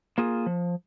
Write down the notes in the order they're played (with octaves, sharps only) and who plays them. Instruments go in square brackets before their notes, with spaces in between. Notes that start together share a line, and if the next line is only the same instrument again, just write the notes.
[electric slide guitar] A#3 F4 G#4
F3